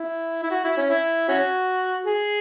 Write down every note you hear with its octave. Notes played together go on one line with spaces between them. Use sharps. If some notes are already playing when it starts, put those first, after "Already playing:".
Already playing: E4
E4
F#4
E4
C#4
E4
C#4 F#4
G#4